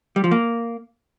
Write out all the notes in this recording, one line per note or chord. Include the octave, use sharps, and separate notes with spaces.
G3
F3
A#3